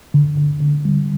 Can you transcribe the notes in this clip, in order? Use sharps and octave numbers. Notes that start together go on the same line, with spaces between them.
D3
D3
D3
G3